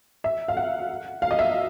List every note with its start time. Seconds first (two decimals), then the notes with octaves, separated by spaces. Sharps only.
0.24 E5
0.48 F5
0.57 F#5
1.22 F5
1.31 D#5
1.39 E5